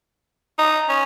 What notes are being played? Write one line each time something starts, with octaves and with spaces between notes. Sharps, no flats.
D#4
C#4